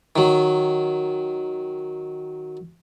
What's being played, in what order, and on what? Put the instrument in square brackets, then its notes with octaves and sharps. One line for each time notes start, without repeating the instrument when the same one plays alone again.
[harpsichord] D#3 F#3